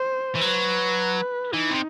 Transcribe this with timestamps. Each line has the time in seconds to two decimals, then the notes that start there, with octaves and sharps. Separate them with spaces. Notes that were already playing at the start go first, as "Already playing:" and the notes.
Already playing: C5
0.35 E3
0.40 F#3 B4
1.54 E3 D#4
1.71 C3